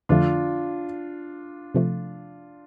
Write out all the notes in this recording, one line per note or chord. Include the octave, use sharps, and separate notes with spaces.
F2 D3 F3 A3 D4 F4
C3 F3 A3